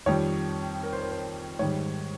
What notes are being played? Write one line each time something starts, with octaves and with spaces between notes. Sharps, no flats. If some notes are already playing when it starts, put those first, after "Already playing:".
F2 D#3 G3 C#5
A#4
C5
A#4
C5
G#2 D#3 G3 C#5